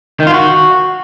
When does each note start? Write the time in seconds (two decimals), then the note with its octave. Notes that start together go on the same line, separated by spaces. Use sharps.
0.20 D#3
0.27 F4
0.34 F#4